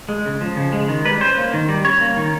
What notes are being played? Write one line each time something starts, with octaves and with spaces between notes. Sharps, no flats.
G#3
C#3
F3
C#3
G#3
D#3
G3 B4
C#4 C5
A#3
D#3
G3
C#4 C#5
A#3
D#3